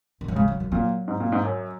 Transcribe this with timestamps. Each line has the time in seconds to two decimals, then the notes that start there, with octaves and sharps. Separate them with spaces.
0.21 D#3
0.28 F#3
0.36 C#3 G#3
0.48 F#3
0.60 D#3
0.72 A#2 F#3
1.08 G#2
1.20 A#2
1.32 G#2
1.44 F#2